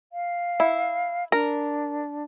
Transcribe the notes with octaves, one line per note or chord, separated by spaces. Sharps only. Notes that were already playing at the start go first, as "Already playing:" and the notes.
F5
E4
D4 A#4